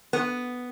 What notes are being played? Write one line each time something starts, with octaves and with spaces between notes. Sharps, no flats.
B3